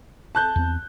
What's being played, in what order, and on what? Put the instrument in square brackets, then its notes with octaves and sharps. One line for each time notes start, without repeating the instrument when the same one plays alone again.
[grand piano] A5 F#6 G6
[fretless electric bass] E2 C4